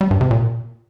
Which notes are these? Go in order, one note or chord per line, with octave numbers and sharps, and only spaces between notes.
G3
G2
C3
A#2